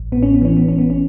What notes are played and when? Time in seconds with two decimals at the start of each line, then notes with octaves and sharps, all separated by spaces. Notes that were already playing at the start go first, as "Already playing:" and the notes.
Already playing: A1
0.12 A2 B3
0.23 C#4
0.35 B3
0.41 E3 C#4
0.57 B3
0.68 A1 C#4
0.78 B3
0.90 C#4